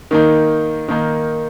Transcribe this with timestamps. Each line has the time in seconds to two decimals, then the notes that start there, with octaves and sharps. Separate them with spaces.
0.11 D#3 A#3 D#4
0.88 D#3 A#3 D#4